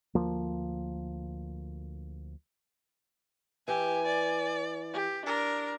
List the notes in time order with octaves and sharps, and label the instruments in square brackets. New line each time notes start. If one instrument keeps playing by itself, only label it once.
[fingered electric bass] D2 F3 A#3
[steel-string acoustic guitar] E3 [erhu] G4 [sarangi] G#5
[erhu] D5
[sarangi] G4
[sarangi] D4 [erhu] A#4